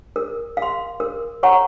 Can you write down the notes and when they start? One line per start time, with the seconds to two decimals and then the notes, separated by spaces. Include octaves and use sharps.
0.16 A#4
0.57 F5
0.62 C6
1.00 A#4
1.43 C#5 F#5 A#5 C#6